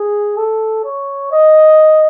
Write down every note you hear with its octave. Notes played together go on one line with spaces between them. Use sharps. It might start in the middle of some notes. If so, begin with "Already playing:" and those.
Already playing: G#4
A4
C#5
D#5